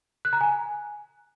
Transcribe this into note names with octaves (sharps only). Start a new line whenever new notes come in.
F#6
A#5
G#5